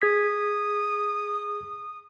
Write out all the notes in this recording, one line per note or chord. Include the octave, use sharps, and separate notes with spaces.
G#4 D#6 G#6 B6